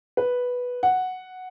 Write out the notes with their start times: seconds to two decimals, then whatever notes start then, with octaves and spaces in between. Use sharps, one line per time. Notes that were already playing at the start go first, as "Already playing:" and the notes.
0.17 B4
0.83 F#5